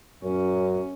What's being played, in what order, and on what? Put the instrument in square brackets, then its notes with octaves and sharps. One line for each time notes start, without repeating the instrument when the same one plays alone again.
[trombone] F#2 [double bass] C#4